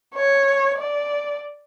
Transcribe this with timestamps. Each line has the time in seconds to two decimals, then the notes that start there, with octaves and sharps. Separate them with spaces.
0.15 C#5
0.79 D5